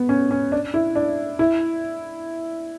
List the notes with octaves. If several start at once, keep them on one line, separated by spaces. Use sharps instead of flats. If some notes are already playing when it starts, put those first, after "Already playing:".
Already playing: B3
C#4
C#4
D4
E4
D4
E4